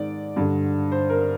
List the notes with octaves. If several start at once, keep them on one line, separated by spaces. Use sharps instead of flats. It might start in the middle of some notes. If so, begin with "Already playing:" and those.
Already playing: G#2 D#3 D5
G2 D3
C5
A#4